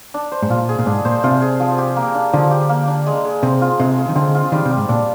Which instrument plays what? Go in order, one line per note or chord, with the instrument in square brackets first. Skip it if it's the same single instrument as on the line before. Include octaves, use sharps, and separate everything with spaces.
[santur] D4
C5
[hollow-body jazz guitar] G#2
[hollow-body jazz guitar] A#2 [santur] F4
[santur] G#4
[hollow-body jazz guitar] A#2
[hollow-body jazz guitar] G#2 [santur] D4
[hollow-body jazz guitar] A#2 [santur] C5
[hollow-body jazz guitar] C3 [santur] F4
[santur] G#4
F3
G4
A#3
D4
[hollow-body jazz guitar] D3 [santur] F3
[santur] G4
A#3
D4
G#3
G#3
[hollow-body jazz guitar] C3 [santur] C4
[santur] F4
[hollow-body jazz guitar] C3 [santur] G#3
[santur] G#3
[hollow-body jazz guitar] D#3
[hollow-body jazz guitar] D3 [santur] C4
[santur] F4
[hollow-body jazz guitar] D#3 [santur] G3
[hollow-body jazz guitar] C3
[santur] G3
[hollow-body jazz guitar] G#2
[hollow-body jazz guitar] A#2 [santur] D4